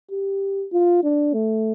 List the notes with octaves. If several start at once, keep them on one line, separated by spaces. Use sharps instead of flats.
G4
F4
D4
A3